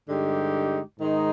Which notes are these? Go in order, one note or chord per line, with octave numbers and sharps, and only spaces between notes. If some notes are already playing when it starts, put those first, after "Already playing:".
G2 D3 G#3 D#4 G4
G#2 D#3 G#3 D#4